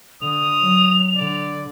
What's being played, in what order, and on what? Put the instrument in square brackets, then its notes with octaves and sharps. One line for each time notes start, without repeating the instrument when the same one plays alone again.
[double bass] D3 [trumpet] D#6 [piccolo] F7
[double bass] F#3
[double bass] D3 [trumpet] D5